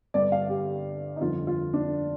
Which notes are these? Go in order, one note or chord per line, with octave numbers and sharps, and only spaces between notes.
G1 G2 D3 D5
F5
G4
D#4
G1 F2 D3 F4
F4
D4